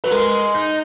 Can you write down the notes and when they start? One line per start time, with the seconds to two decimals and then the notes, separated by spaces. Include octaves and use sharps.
0.04 F#3 B4
0.11 G#3 A#4
0.54 D#4